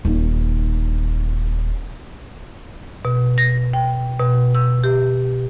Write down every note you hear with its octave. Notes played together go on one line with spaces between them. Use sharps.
D#1 D#4
B2
A#6
G5
B2
E6
G4